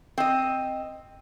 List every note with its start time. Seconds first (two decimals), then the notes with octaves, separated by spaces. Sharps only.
0.18 C4 D#5